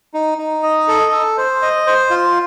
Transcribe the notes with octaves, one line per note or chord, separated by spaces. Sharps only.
D#4
D#4
D#5
A4
A4
C5
D#5
C5
F4